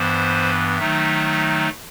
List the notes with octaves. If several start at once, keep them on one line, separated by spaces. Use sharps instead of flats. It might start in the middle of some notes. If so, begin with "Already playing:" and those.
Already playing: G2 E3 B3 C5
D#3 F#3 A3 D#4 E5